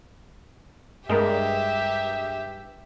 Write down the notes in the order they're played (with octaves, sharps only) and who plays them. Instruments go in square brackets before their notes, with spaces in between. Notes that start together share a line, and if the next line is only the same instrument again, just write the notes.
[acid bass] G2 [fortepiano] G#3 A#3 A#4 [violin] G4 E5